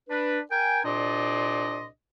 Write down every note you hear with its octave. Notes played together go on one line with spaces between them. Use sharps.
D4 B4
A#4 G5 G#5
C2 A#2 D4 D5 D#5 C6